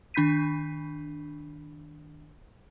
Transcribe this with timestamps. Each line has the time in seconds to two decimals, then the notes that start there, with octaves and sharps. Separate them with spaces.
0.14 D#3 D4 B5 G6 B6 D#7